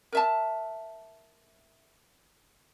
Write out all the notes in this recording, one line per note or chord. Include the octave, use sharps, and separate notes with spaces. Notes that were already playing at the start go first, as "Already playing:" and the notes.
A#4 E5 A5